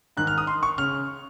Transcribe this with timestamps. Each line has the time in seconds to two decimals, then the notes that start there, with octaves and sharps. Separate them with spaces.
0.17 G#2 D#3 F#6
0.27 F6
0.38 D#6
0.47 C6
0.63 C#6
0.78 C#3 F6